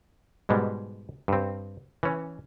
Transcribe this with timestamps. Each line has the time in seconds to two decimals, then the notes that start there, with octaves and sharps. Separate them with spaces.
0.49 G#2 B2 G3 G#3
1.28 G2 C4
2.03 E3 C#4